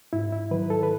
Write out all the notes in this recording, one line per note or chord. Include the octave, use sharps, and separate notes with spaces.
G#2 E4
E4
D#3 F#3 B4
A4
B4